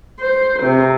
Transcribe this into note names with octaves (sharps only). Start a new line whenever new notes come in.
C5
C3